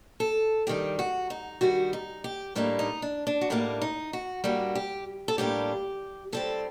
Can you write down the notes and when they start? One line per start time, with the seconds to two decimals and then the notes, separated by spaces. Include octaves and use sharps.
0.20 A4
0.67 G2 D#3 G3 G4
0.99 F#4
1.30 D#4
1.61 G2 D#3 G3 F#4
1.93 D#4
2.24 G4
2.56 A2 G3 A#3 D4 D#4
2.79 D#4
3.02 D4
3.27 D4
3.41 F#4
3.50 A2 G3 A#3 D4 D#4
3.82 D#4
4.13 F#4
4.44 A2 G3 A#3 D4 F#4
4.75 G4
5.28 A4
5.38 A2 G3 A#3 D4 G4
6.32 A2 G3 C4 A4